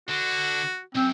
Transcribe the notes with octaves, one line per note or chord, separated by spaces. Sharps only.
D3 F#4
B1 F#2 C4